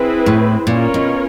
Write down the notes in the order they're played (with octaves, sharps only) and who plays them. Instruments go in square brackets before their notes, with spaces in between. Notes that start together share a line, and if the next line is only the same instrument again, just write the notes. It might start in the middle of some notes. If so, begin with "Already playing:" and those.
Already playing: [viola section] C4 E4 G#4 B4
[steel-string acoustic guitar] A2
[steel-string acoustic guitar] A#2 [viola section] C#4 F4 A#4 C#5
[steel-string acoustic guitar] B2